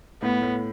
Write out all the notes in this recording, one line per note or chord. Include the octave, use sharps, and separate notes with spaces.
A2 B3
A2